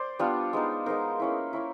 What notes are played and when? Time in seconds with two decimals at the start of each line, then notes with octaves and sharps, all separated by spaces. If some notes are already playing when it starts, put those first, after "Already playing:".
Already playing: C5 D5
0.19 G3 B3 D4 F4
0.53 G#3 B3 D#4
0.86 G#3 B3 D#4 A#4 C5
1.20 A#3 C#4 E4
1.53 A#3 C#4 E4